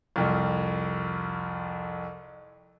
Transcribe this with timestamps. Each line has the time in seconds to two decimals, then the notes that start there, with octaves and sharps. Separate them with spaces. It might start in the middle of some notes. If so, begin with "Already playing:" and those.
0.16 C2 F2